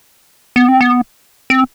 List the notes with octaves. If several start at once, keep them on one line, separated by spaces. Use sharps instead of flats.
B3
C4
B3
C4